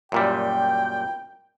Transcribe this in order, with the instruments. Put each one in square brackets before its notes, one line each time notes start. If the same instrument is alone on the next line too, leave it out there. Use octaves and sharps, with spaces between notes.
[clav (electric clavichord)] F#2 A#2 G3 [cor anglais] G5